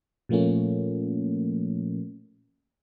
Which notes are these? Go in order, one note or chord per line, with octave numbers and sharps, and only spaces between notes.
A#2 F3 A3 A#3 C#4